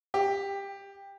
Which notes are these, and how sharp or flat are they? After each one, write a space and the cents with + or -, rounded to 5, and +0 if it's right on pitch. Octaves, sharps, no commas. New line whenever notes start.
G4 +15